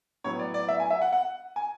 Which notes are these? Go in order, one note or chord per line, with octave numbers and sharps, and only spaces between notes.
A2 F#3 B3 C#5
D5
D5
E5
G#5
E5
F#5
F#5
G#5